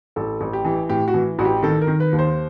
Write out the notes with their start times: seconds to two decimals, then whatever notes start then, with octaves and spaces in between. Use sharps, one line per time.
0.16 A1 A4
0.41 A1
0.53 G4
0.65 E3
0.89 A2 G4
1.08 F#4
1.14 E3
1.39 A1 F#4
1.45 G4
1.63 D#3 A4
1.82 A#4
1.87 D#3
2.00 B4
2.13 D#2
2.19 C5